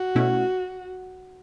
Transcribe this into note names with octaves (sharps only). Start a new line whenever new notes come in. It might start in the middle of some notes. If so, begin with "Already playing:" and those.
Already playing: F#4
B2 A3 C#4 E4